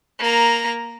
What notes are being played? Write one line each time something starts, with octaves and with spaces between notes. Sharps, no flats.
A#3 A#5